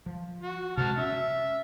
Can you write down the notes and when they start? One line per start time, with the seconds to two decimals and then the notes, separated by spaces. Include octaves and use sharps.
0.06 F3
0.43 F#4
0.77 C3 G#3 F#4 A5 F6
0.97 C#4 E5